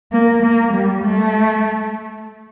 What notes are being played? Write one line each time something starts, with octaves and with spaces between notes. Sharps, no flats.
A#3
A#3
G3
A3